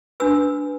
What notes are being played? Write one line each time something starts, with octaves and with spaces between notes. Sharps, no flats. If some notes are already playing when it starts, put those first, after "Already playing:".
D4 F#4 B4 E6